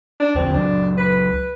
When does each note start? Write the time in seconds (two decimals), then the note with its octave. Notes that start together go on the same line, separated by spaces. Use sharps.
0.20 D4
0.35 E2 D3 F3 C4
0.54 C#2 F#3 D4
0.97 B4